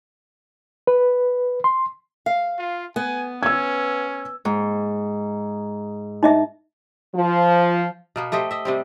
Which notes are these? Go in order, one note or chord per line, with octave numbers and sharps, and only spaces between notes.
B4
C6
F5
F4
B3 G#5
C#4 E6 G#6
G#2
D#4 D#5 E5
F3
B2 A#3 B3
A3 G4 C5 D#5
D#5 E5
C3 G3 C4